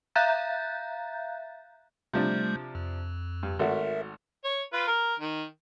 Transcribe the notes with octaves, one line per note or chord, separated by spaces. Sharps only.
E5 F5 A#5 F#6 G6 A6
C3 F3 G3 A3 D4 G6
F2
G2
G#1 A3 F#4 A#4 E5
C#5
F4 B4
A#4
D#3